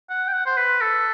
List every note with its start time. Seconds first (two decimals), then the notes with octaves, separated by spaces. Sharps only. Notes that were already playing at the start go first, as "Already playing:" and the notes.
0.10 F#5
0.28 G5
0.33 F#5
0.46 C5
0.57 B4
0.81 A4